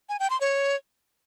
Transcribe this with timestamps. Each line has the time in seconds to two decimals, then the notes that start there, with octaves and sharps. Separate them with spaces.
0.09 G#5
0.20 G5
0.30 C6
0.41 C#5